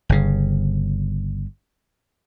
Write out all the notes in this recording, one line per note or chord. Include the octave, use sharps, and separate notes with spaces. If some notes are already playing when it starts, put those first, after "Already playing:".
G1 C#3